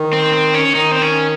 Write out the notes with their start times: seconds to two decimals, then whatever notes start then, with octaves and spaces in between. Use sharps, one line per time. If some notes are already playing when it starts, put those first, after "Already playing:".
Already playing: D#3
0.13 C4
0.33 C4
0.54 C#4
0.75 D#3 D#4
0.92 C4
1.02 C#4